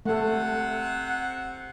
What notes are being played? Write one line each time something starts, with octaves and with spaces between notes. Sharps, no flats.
C3 A3 A4 F#5